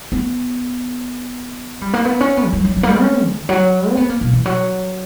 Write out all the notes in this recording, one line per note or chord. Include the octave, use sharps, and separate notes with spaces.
B3
G3
A#3
B3
C#4
B3
E3
F#3
F#3
F#3
A#3
G3
C#4
D3
F#3
C#4
B3
A#3
B2
E3
F#3